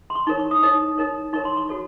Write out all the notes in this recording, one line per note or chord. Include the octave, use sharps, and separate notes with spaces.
C6
C#6
D#4 A#4 C#5 C#6
C#6
D#6
D#4 A#4 C#5 D#6
D#4 A#4 C#5
D#4 A#4 C#5 C#6
C6
C#6
F#4 A4 C#5